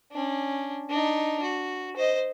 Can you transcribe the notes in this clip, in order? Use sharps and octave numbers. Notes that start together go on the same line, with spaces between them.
C#4 D4
D4 D#4
F#4
C5 D#5